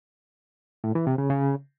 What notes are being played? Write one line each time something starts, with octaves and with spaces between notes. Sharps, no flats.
A2
E3
C3
C#3
C#3